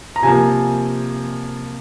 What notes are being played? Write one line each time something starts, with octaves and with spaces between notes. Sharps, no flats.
A#5
C3 F3 A#3 G#5